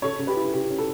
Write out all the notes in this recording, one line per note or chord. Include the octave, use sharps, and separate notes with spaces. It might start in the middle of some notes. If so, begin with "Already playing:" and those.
C#3 A4 C#5
C#3
G4 B4
E4
C#3 G4
C#4
A4